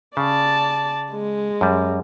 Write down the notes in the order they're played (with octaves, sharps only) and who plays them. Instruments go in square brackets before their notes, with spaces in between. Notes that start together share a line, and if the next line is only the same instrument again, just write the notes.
[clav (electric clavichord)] C#3 [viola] D5 A5
[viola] G#3
[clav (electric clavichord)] F#2 G3